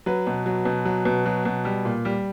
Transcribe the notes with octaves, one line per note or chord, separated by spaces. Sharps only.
F#3 B4
B2
F#3
B2
F#3
B2
F#3
B2
G3
A#2
G3